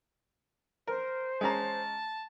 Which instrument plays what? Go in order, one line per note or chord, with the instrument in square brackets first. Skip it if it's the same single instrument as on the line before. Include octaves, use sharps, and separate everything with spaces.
[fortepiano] A#4 [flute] C5
[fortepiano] G#3 C#4 A#5 [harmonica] A5